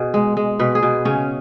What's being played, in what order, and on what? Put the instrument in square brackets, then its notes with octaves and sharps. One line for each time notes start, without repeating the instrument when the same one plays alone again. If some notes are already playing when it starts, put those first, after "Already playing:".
Already playing: [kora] B2 G#4
G#3
G#3
B2 B4
G#4
B2
C#3 C#4